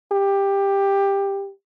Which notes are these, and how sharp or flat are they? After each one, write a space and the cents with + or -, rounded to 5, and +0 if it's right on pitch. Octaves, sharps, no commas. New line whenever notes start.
G4 +15